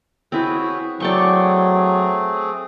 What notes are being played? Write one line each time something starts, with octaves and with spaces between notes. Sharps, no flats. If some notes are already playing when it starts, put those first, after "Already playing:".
C4 E4 F#4 G#4 B4 C#5
F#3 A3 C4 G#4 D5 G5 C#6